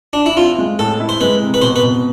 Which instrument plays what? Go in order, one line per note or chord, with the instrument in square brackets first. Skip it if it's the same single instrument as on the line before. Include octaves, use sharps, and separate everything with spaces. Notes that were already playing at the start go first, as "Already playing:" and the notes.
[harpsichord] D4
E4
[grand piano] C4 [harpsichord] F4
[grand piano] G#3
[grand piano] A2 [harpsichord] A4
[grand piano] E4
[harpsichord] C5
[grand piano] G#3 [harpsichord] B4
[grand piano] C3
[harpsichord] B4
[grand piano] B2 [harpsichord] C5
[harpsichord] B4
[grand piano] B2